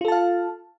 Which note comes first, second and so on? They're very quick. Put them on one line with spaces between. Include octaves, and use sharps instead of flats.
F4 A4 A5 F5